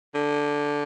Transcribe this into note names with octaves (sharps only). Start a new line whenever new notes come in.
D3